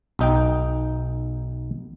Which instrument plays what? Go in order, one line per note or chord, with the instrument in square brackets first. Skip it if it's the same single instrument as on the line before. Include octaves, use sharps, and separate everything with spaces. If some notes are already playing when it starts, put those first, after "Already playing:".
[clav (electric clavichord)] B1 D#4 G5